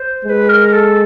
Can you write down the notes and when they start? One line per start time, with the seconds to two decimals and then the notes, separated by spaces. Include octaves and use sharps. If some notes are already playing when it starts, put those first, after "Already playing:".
Already playing: C5
0.24 G#3 C5
0.29 B4
0.49 A#4
0.73 A4